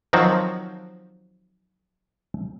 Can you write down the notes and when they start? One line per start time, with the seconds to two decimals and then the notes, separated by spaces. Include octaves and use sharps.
0.13 D#3 F3 F#3 C4 F#4